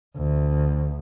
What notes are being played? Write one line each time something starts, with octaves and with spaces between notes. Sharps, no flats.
D2